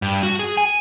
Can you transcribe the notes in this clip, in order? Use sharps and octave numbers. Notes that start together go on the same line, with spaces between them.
G2
F#4
G#4
G#5